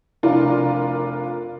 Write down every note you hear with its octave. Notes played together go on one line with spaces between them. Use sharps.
F1 D4 F4 A#4